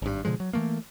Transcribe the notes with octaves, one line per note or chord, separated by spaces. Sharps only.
G#1 G2
B2 D3 F3 G#3
F#3
E3 A3 A#3